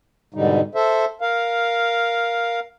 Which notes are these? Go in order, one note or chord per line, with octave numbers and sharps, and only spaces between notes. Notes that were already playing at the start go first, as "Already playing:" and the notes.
G#2 B2 D3 G3 D#4
A4 C5 E5
A#4 F5